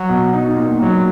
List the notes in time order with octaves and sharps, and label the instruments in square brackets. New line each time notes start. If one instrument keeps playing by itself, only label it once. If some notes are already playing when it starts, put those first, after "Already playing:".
Already playing: [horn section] F#3
[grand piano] B2
D#4
A#2
[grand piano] A#2 [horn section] F#3